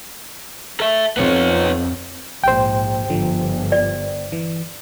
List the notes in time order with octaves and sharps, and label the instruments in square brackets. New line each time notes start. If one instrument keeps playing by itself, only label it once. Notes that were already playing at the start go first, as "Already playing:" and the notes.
[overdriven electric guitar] A4 E5
[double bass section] F2 [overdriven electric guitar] B3 C#5
[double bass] A#1 G#2 [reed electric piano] C5 G5
[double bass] G1 [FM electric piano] D3 F3
[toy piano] D5
[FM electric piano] E3